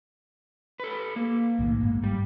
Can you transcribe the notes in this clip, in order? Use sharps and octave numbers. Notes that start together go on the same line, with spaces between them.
A4 B4
A#3
B1 A2 D#3
G1 G#2
G3